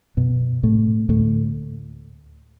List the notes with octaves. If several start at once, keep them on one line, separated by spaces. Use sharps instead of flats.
F#2 B2 B3
A2 C3 A3
D2 A2 A3